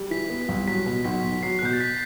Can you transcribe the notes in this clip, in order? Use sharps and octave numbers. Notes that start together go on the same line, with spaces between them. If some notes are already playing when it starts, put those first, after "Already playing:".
Already playing: G3
E3 B6
B3
C2
F#3 B6
B2
B1 B6
B1
F#3 C7
F#6
B2 G6
A6
B6